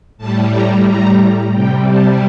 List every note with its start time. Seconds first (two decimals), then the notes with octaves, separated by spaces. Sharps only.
0.18 A2 G3 A5
0.52 A#5
0.86 A#5
1.54 C3 G3 G5
1.88 A5